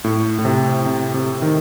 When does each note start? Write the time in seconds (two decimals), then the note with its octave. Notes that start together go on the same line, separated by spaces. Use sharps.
0.04 A2
0.39 A2
0.45 C3
0.86 C3
1.14 C3
1.42 D#3